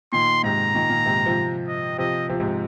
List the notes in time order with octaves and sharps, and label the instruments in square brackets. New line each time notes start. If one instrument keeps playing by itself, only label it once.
[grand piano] A#2 D#3 [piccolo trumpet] C6
[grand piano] G#2 C3 [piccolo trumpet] A#5
[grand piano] A#2 D#3
A#2 D#3
G#2 C3
C3 F3
[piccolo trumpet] D#5
[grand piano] C3 F3 [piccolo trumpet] D#5
[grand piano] C3 F3
G#2 C3